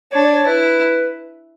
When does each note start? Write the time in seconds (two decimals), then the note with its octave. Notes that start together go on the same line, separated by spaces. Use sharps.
0.12 D4 C#5
0.24 D5
0.35 C#5
0.46 E4 B4